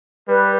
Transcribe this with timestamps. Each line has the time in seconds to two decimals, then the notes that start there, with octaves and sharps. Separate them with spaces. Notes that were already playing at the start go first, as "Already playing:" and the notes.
0.29 G3 B4